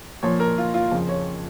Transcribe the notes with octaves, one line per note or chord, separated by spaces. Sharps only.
A#2 F3 C#5
A#4
F4
F4
F2 C#3 F3
C#5